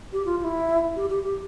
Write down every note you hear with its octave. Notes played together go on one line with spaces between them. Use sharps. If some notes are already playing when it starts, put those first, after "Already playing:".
G4
F4
F4
E4
G4
G4
G4